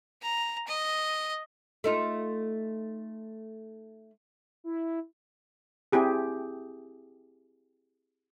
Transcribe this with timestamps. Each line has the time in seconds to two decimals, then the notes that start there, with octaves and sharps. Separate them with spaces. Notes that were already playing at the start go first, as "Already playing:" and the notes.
0.22 A#5
0.67 D#5
1.84 A3 D#4 F4
4.64 E4
5.92 C4 E4 G4 G#4